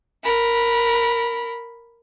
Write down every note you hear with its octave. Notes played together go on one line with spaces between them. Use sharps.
A#4 B5